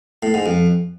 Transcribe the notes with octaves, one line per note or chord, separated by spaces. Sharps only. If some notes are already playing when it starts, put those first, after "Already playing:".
A2
G#2
F2